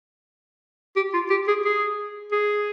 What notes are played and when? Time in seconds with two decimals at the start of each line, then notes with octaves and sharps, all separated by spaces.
0.96 G4
1.13 F4
1.30 G4
1.48 G#4
1.65 G#4
2.32 G#4